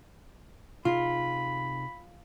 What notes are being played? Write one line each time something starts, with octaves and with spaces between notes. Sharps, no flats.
C3 D#4 F4 G#4 B5